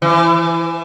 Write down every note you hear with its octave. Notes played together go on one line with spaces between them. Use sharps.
E3